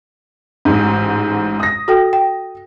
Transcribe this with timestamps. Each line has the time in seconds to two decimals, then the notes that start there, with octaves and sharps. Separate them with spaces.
0.65 A1 G#2
1.60 D#6 A#6
1.88 F#4 A4 G5
2.13 G5